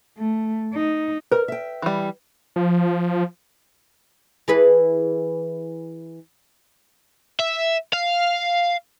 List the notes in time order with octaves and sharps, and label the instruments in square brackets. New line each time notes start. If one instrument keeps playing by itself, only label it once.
[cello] A3
D#4
[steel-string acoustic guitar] A#4 [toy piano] B4
[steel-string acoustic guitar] E5 G5
[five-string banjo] E3 G3
[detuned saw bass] F3
[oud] E3 G#4 B4
[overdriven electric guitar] E5
F5